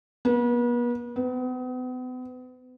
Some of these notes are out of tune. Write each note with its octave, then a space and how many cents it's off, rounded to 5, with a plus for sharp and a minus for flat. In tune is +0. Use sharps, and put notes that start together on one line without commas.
B3 -40
B3 +40